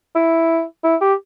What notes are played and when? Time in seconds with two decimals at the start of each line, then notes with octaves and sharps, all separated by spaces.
0.15 E4
0.84 E4
1.02 G4